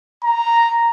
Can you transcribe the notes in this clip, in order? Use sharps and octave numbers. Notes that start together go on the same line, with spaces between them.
A#5